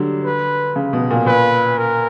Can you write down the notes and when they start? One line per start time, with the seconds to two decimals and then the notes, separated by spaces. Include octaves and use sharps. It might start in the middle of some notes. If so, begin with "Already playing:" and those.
Already playing: D3 F#3 G3
0.25 B4
0.76 C#3
0.93 B2
1.10 A#2
1.26 A#2 B4
1.78 A#4